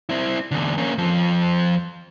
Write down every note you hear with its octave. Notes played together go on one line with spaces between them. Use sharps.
C4 E4
E2 D3
A#3 C#4
F2 F3